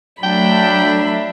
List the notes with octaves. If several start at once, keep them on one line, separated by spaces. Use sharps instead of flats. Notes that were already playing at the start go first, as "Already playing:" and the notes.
F#3 A3 D4 E5 G5 B5